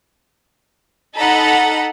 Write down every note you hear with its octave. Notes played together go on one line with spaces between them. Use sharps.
D#4 A4 D#5 F#5 A#5 B5